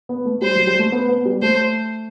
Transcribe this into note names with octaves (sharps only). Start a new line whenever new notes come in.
B3
A3
G3 C5
F#3
G3
A3
B3
B3
G3
A3 C5